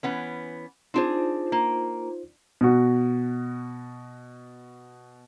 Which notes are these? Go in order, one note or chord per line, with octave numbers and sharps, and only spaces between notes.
E3 B3 C#4
C4 D4 D#4 F4 G#4 C5
A#3
B2 F#4